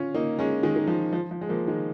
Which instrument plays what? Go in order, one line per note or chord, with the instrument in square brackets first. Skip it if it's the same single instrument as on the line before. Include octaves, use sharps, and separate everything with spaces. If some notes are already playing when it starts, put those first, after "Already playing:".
Already playing: [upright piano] C#4 F4
A#3 D#4
G#3 C#4
D#3 G#3
D#3
F3
F3
F3
G#3
F3 A#3
D#3 G#3